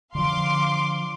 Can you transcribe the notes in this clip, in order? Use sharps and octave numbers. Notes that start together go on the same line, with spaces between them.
D3 F3 F5 C6 D6